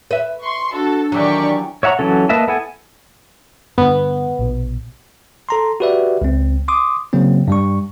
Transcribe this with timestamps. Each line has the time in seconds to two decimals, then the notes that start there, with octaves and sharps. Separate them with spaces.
0.11 B4 E5
0.41 C6 C#6
0.73 D4 F#4 A4
1.12 D#3 E3 F#3 G4 D5 C#6
1.83 C#5 E5 F#5 A#5 C#6
1.99 E3 F#3 C#4 A4
2.29 A#3 B4 D#5 E5 A5
2.48 B3 E4 A4 F#5 G#5
3.78 G2 D3 B3
4.39 A#1 B2
5.49 A4 A#5 C6
5.80 F#4 G4 B4 D5 E5
6.22 C#2 C4
6.68 C6 D6 D#6
7.13 C#3 F#3 A#3 C4
7.48 G2 G3 C#6